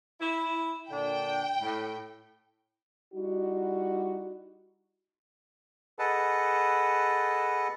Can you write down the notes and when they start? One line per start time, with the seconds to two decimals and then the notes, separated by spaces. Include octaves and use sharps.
0.21 E4
0.91 A#2 D3 D4 G5
1.62 A2
3.14 G3 D#4 E4 F#4
5.99 G#4 A4 B4 D#5 F#5 A5